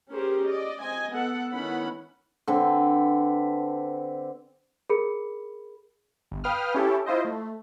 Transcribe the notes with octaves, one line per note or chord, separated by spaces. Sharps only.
C#4 G4 G#4 A#4 C5
D5 D#5
C4 D#5 G#5
B3 A4 F#5
D#3 B3 C#4 E4 F#5 B5
D3 C4 B4
G#4 A#4 B5 C#7
G1
B4 F5 G5 D#6 F6
C#4 E4 G4 A4
E4 F4 C5 D#5
A3